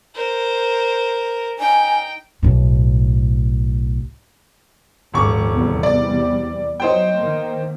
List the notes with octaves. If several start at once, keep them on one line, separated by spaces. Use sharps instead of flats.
A#4 C5
D#4 G5 G#5
B1 A2
D#1 G#1 G#2 F3 C#6 D6
E2 C3 G3
D5
F#3 D#4 C5 G5
D#3 A#3